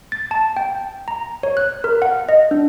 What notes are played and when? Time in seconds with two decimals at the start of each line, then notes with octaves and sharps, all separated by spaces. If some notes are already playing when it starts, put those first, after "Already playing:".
0.12 A6
0.31 A5
0.57 G5
1.08 A#5
1.43 C#5
1.57 F#6
1.84 A#4
2.02 F#5
2.29 D#5
2.51 D4